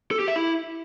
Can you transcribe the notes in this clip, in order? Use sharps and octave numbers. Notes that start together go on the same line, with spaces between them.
A4
G4
E5
E4